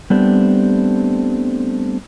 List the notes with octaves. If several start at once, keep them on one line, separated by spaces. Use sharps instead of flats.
G3 A3 B3 C4 D4 G4